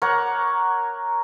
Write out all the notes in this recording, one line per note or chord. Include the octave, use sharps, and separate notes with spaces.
A#4 C#5 F#5 D6